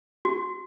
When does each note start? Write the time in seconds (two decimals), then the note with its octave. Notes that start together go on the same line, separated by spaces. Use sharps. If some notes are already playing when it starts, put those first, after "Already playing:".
0.25 F#4